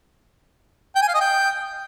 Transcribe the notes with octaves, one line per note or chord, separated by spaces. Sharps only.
G5
G#5
F5
D#5
G5